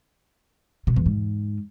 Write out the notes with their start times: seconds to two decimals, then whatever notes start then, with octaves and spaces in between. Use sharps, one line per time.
0.87 B2
0.96 E2
1.06 G#2